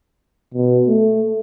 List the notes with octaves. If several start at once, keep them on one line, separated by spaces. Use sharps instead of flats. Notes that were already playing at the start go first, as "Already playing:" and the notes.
B2
A3